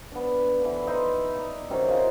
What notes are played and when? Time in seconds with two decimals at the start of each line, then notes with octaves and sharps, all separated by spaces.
0.12 B3 D4
0.61 D3 E3
0.87 D#4 B4 E5 C6
1.36 D5 A#5
1.70 C3 D#3 F#3 C#4
1.88 C3 D#4 F4 A#5